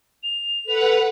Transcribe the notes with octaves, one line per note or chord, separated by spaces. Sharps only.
F7
A4 B4 F#5